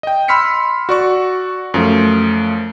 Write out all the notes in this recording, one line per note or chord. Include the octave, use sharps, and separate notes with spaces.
D#5 G5
B5 C6 E6 F6 B6 C#7
F#4 D5 C#6
F#2 F3 A3